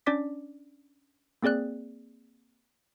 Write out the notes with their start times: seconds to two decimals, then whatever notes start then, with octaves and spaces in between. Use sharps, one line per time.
0.06 C#4 D4 D5 D6 B6
1.43 A#3 C4 G#4 D5 F#6